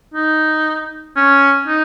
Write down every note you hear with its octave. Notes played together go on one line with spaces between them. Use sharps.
D#4
C#4
D#4